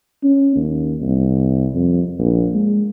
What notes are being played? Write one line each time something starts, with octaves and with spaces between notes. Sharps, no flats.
C#4
D#2
C2
F2
A#1
G#3